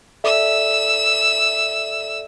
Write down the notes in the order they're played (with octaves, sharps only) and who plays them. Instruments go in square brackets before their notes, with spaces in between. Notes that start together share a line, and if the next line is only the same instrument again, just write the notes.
[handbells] A4 D5 E5 [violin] E6